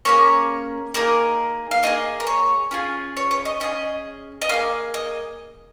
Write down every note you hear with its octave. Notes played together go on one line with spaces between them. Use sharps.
A#3 C#4 G#4 C#5
A#3 D#4 G#4 A#4
F5
A#3 D#4 G#4 D#5
A#4
C#5
C#4 F4 G#4
C#5
C#5
D#5
C#4 F4 G#4 D#5
D#5
A#3 D#4 G#4 F5
D#5